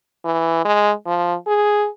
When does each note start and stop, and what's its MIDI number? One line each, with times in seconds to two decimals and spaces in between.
0.25 0.62 52
0.65 0.92 56
1.06 1.35 53
1.47 1.88 68